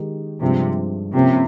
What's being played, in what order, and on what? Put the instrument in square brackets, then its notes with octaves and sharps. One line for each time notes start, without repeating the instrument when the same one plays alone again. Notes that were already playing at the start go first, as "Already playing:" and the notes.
Already playing: [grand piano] D#3 G#3 D#4 G4
[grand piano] G2 F3 G#3 [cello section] C3
[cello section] C3 [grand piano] F3 A#3 C#4